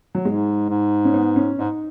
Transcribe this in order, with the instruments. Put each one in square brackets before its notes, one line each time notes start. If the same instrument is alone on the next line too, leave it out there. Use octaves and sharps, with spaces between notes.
[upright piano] F#3
[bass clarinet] G#2 [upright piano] G#3
[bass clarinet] G#2
[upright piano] C#4
B3
C#4
[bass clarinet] G#2 [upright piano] D#4